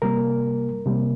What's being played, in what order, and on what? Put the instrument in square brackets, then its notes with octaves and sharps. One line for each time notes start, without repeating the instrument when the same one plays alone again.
[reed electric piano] C3 G3 A#3 A#4
C3 G3 A#3